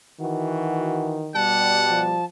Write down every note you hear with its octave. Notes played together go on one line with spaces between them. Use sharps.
D#3 E3 F#4
B2 G3 F#5 A5
F3